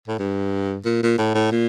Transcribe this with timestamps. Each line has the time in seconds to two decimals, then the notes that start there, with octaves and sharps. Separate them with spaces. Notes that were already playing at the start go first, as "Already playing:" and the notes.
0.08 A2
0.19 G2
0.85 A#2
1.03 A#2
1.18 A2
1.35 A2
1.51 A#2